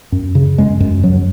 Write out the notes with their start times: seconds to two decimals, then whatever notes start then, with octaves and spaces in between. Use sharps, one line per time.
0.12 F#2
0.35 C#3
0.58 F#2 G#3
0.80 F#2
1.03 F#2 F#3